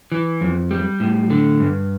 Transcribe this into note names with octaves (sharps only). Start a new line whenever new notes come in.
E3
F2
G3
A2
D3
G2